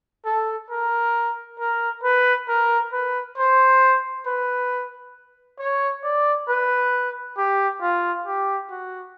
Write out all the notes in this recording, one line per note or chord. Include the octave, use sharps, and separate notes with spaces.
A4
A#4
A#4
B4
A#4
B4
C5
B4
C#5
D5
B4
G4
F4
G4
F#4